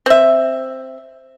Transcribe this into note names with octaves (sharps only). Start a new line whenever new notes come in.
C4 E5